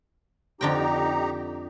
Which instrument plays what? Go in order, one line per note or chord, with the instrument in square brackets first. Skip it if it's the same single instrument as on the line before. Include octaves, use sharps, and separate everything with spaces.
[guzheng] F2 D3 G5 [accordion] D#4 G4 A#5